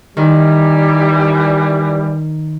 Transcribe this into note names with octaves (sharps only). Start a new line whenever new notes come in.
D#3 E3 G3